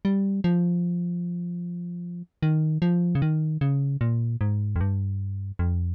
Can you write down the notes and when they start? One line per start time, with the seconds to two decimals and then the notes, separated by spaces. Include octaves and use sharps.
0.05 G3
0.44 F3
2.43 D#3
2.82 F3
3.15 C#3
3.22 D#3
3.61 C#3
4.01 A#2
4.41 G#2
4.76 F2
4.81 G2
5.59 F2